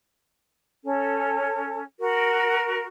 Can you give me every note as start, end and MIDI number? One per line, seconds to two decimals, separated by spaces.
0.84 1.83 61
0.84 1.83 69
1.99 2.86 66
1.99 2.86 70